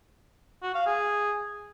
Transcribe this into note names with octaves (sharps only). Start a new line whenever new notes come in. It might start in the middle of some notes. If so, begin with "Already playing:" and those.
F#4
F5
G#4